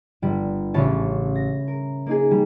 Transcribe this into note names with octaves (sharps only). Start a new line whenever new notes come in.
G1 G3
A1 C#3 C#5 A5
A#6
A#4
A#3 D#4 G#4
G3